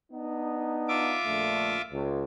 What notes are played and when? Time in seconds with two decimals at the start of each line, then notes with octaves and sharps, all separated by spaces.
0.11 B3 D4 D#4
0.89 F4 E5 D6
1.24 A#1 D3 A3
1.91 C#2